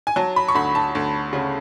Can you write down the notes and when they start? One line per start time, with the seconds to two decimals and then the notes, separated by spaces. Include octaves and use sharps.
0.07 G#5
0.16 F#3 A5
0.36 B5
0.48 C#6
0.55 D2 B5
0.75 A5
0.95 D2
1.33 C#3